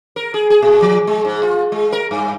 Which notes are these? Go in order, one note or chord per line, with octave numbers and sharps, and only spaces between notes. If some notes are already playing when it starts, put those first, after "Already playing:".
A#4
G#4
G#4
A#2
F3
G#3
G#2
F4
G#3
A#4
G2